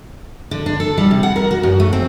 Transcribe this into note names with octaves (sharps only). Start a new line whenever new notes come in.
D3
D4
A4
G3
C3
F#5
A#4
F#4
F#2
A3
C4